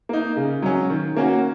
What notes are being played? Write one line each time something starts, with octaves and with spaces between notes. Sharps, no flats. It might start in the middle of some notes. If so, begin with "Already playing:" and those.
A#3 D#4
C#3
F#3 C#4
D#3
A#3 C#4 F#4